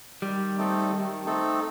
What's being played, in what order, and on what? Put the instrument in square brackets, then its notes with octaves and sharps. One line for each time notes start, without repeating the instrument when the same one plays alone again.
[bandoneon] D#3 [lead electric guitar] G3
[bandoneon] A3 C4 D#4 A4
D#3
A3 C4 D#4 A4